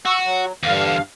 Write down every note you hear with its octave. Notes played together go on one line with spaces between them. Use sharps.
F#4 C#6 E6
F#3
E2 G2 D3 F5